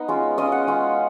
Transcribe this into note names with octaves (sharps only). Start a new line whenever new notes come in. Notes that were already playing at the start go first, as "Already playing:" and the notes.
Already playing: B3 D#4 D#5
G#3 C#4 F4
G#3 C#4 F4 D#5
F#5
G#3 C#4 F4